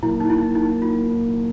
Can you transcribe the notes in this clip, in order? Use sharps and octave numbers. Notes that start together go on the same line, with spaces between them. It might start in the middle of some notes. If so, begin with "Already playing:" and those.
A#2 F#3 A#3 E4
D#4
E4
D#4
D#4
F4